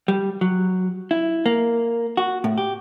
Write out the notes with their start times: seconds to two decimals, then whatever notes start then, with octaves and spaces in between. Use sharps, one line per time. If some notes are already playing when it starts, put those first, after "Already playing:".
0.08 G3
0.41 F#3
1.11 E4
1.46 A#3
2.17 F#4
2.44 A2
2.58 G4